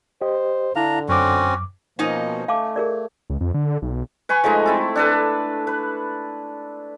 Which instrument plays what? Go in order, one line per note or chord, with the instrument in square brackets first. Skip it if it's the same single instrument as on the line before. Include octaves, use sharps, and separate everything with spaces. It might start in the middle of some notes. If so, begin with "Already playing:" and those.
[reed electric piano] G4 D#5 [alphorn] C5
[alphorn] D3 [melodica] D4 A#5 [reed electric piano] E4 F5
[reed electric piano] F#2 D6 [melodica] C4 C#4 F#4
[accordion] B2 F3 A#3 [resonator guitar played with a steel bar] C#4 D#4 D#5
[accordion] A3 [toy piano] F5 A5 D6
[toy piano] G#4 A#4 D5
[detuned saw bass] C#2
F2
D3
B1
[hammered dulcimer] B4 G#5 C#6
F3 G#3 A3 D#4
C4 E4 A4
D4 A4 B4
B4